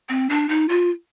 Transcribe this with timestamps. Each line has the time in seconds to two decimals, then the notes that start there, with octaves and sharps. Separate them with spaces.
0.09 C4
0.30 D4
0.49 D#4
0.69 F4